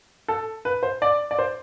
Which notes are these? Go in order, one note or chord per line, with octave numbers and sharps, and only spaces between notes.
A4
B4
C5
D5
D5
C5